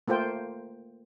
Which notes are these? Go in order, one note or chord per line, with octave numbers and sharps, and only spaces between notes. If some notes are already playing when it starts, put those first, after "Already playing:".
A3 A#3 F4 C5 G5